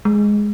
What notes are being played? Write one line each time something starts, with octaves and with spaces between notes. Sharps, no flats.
G#3